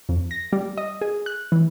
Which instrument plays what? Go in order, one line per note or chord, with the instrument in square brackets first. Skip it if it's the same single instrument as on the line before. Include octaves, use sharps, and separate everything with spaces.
[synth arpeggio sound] F2
A#6
G3
D#5
G#4
F#6
E3